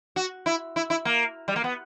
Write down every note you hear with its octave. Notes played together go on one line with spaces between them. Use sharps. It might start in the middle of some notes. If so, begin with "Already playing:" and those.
F#4
E4
E4
E4
A#3
G3
A#3
B3